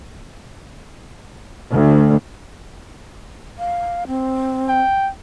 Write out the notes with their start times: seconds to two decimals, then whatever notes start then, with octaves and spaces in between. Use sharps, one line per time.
1.72 D2
3.58 F5
4.07 C4
4.69 G5